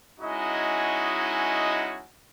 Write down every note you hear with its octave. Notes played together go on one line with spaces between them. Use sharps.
G#3 C#4 D#4 E4 F#4 D#5